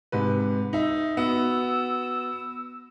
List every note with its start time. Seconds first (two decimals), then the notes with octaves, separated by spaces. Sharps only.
0.12 G#2 C3 B4
0.73 D#4 E5
1.17 B3 F#4 E6